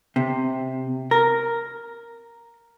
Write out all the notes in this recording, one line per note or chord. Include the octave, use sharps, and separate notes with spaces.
C3
A#4